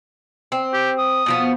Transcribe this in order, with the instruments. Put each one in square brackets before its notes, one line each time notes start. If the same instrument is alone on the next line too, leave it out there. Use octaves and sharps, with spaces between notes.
[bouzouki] C4
[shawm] G4
D#6
[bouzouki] B2 F3 B3